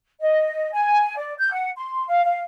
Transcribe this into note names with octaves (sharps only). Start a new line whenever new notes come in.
D#5
G#5
D5
G6
F#5
C6
F5
F5